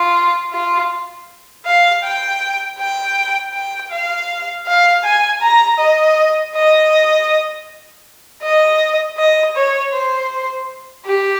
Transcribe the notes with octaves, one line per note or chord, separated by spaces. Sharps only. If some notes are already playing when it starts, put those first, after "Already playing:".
Already playing: F4
F4
F5
G5
G5
G5
F5
F5
G#5
A#5
D#5
D#5
D#5
D#5
C#5
C5
G4